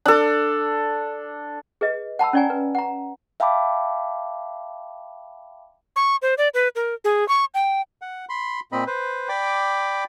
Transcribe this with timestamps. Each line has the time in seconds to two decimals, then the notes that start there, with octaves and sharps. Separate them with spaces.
0.06 D4 A4
1.81 G#4 B4 D#5
2.19 F#5 A5 B5 E6
2.33 C#4 C#5 D5 F#5 G#5 A#5
2.50 B4
2.75 F#5 A#5
3.40 E5 F5 G5 A5 B5 D6
5.96 C#6
6.22 C5
6.38 D5
6.54 B4
6.76 A#4
7.04 G#4
7.29 C#6
7.54 G5
8.02 F#5
8.29 B5 C6
8.72 A#2 C4 D#5 B5
8.87 B4 C5
9.29 D5 G5 B5 D6